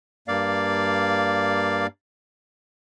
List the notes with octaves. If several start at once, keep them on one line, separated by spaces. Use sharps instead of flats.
G2 A#3 D5 F5